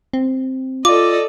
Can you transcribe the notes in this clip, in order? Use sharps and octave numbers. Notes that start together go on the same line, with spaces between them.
C4
F4 A4 D5 D#5 D6